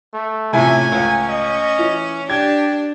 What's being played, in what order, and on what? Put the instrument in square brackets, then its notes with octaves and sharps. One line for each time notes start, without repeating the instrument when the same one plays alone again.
[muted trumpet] A3
[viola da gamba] A2 C#4 [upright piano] C3 F3 E4 [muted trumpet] G#5
[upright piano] C#2 [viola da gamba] C#4
[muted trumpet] D#5
[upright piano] E3
[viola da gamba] D4 [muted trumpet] G4 [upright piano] G#6